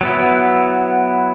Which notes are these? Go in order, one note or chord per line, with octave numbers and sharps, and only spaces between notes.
F#3 B3 E4